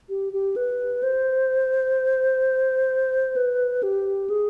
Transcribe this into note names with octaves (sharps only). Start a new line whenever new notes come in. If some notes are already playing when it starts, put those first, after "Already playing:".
G4
G4
B4
C5
B4
G4
G#4